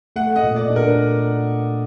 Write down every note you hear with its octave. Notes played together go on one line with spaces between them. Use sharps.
A3 F#5
D#5
A#2
D5
D4
A#4